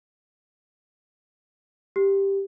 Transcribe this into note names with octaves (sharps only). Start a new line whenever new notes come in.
G4